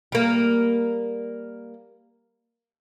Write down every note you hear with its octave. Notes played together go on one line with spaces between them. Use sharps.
G3 A#3